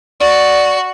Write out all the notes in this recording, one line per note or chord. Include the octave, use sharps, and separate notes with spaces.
F#4 D5